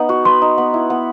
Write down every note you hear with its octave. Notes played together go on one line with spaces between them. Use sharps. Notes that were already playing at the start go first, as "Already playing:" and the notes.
Already playing: B3 D#4
F#4
B4 C6
D#4
B3
E4
B3